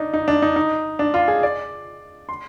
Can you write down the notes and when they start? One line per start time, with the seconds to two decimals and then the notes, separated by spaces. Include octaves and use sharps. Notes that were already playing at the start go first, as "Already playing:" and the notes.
Already playing: D4 D#4
0.13 D#4
0.28 D4
0.42 D#4
0.56 D#4
0.99 D4
1.14 F4
1.28 G#4
1.43 D5
2.29 C6